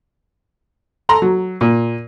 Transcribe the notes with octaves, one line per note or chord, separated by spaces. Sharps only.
A4 A#5 C6
F#3
A#2